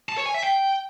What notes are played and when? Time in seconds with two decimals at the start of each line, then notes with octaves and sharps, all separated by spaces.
0.09 A5
0.17 C#5
0.26 G#5
0.34 E5
0.43 G5